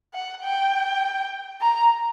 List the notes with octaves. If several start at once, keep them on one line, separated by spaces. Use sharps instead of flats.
F#5
G5
A#5